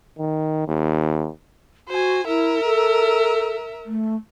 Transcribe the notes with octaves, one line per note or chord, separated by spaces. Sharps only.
D#3
D#2
F#4 C5 G#5
E4 A#4 E5
A4
A3